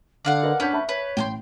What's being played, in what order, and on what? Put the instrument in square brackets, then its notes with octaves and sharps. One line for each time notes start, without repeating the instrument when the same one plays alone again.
[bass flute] D3 [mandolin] D5 F5 F#5
[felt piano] A#4 B4 D#5
[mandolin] C#4 B4 [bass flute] D4 [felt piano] C#5 F#5 G6
[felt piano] E5 A5 B5
[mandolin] B4 [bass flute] C#5
[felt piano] A1 [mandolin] G5 G#5 C6